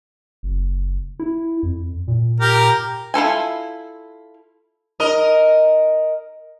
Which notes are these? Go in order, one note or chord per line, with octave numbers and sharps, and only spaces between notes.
F#1
E4
F2
A#2
G4 A#4
E4 F4 A4 G#5
A#4 D#5